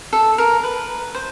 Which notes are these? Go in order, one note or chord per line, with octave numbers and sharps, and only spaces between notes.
A4
A#4
B4
C5